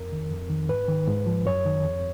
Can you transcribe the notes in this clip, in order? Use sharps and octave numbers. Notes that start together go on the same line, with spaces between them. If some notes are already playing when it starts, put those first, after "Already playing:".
Already playing: F2 A#4
D#3
F2
D#3
G#2 B4
D#3
G#2
F3
F#2 C#5
D#3
F2